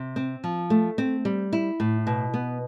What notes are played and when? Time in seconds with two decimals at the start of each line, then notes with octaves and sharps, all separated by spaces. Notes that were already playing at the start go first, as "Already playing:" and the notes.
Already playing: C3
0.16 C4
0.44 F3
0.70 A3
0.98 C4
1.25 G3
1.53 E4
1.80 A2
2.07 B2
2.34 B3